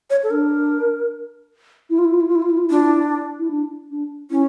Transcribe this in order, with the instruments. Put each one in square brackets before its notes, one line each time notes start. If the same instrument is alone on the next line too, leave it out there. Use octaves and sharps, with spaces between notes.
[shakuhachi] C#5
A4
[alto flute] D4 [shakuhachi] A#4
[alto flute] E4
F4
E4
F4
E4
F4
E4
F4
E4
F4
E4
[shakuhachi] D4 [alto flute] F4
[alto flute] E4
E4
D4
D4
[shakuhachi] C#4 [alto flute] E4